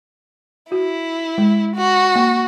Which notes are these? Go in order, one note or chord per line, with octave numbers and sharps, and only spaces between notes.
E4 F#4
G#3
F#4
A#3